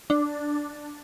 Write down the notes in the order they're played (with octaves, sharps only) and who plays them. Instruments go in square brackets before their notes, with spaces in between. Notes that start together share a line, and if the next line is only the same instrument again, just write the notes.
[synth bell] D4